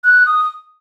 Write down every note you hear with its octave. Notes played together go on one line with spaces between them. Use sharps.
F#6
D#6